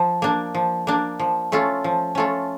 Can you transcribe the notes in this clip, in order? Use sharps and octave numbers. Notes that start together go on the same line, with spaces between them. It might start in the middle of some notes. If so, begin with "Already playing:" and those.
Already playing: F3
A#3 D4
F3
A#3 D4
F3
A3 C#4 F4 A4
F3
A3 C#4 F4 A4